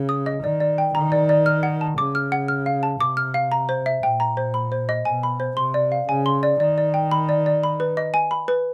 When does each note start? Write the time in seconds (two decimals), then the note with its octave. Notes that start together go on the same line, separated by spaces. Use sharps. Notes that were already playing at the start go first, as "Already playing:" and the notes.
Already playing: C#3
0.09 D#6
0.26 D#5
0.43 D#3 D5
0.60 D5
0.78 G5
0.95 D#3 A#5
1.12 D5
1.29 D5
1.46 F6
1.63 F#5
1.81 A5
1.98 C#3 D6
2.15 F6
2.32 F#5
2.48 F6
2.66 F5
2.83 A5
3.00 C3 D6
3.17 F6
3.34 F5
3.52 A#5
3.69 C5
3.86 E5
4.03 A#2 G5
4.20 A#5
4.37 C5
4.54 B5
4.72 C5
4.89 D#5
5.05 B2 G#5
5.23 B5
5.40 C5
5.57 C3 C6
5.74 D5
5.92 F5
6.09 C#3 G#5
6.26 C6
6.43 D5
6.60 D#3 D5
6.78 D5
6.94 G5
7.11 B5
7.29 D5
7.46 D5
7.63 B5
7.80 B4
7.97 D#5
8.14 G#5
8.31 B5
8.48 B4